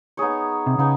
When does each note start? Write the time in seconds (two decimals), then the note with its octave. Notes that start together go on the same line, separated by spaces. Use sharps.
0.17 B3 D#4 G#4 C#5
0.66 C3
0.78 C#3 B3 D#4 G#4